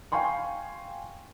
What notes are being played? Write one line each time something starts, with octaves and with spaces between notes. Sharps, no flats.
F5 G5 G#5 C6 C#6